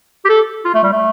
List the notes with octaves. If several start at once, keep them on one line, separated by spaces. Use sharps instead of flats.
G4
A4
F4
A3
G3
A3